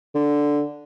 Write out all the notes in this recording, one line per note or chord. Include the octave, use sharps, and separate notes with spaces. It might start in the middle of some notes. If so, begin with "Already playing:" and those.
D3